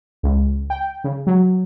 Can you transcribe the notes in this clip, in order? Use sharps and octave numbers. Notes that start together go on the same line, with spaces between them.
C#2
G5
C#3
F#3